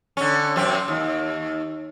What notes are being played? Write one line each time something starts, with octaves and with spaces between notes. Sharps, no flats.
D3 C#4
F#2 C3 C4
D#2